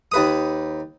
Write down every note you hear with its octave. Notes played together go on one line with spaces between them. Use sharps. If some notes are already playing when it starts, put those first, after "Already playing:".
D#2 B4 D#6